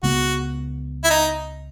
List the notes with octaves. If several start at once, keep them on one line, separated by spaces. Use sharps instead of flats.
C#2 C#3 G#3 B3 F#4
E4
D#4